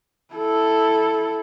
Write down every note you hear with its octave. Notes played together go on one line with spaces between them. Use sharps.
E4 A4